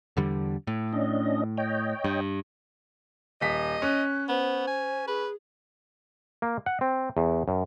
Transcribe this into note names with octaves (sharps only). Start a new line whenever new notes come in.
E2 D3 G3
A2
C#4 D4 D#5
C#5 D#5 G5
G2
D#1 D#5 B6
C#4 F#6
B3 C5
G#5
G#4 B4
A#3
F#5
C4
E2
F#2